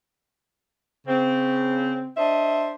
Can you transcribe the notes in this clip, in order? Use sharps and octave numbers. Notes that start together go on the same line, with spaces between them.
C#3 C4
D4 C5 D#5 E5